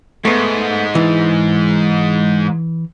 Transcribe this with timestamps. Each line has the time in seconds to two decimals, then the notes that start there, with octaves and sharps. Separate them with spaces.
0.25 G#2 A3 B3
0.95 E3